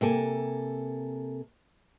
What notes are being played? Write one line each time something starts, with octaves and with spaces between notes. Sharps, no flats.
C3 A#3 A4 G#5